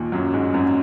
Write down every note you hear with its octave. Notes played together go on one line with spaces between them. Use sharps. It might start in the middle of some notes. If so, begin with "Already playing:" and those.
Already playing: D#2 A#2 D#3 A#3
F#2 F#3
G#2 G#3
F#2 F#3